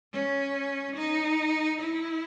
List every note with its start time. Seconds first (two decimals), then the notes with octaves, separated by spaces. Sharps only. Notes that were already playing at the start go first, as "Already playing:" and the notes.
0.13 C#4
0.96 D#4
1.81 E4